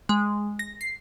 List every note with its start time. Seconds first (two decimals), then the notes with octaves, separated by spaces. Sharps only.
0.09 G#3
0.59 A#6
0.81 C7